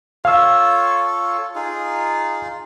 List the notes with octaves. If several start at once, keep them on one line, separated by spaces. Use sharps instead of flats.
F4 A4 C#5 F5 E6
D#4 F4 G#4